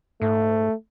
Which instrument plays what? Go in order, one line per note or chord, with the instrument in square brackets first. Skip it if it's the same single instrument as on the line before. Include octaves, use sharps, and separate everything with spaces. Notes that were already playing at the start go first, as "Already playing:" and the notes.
[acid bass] G#2 [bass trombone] A3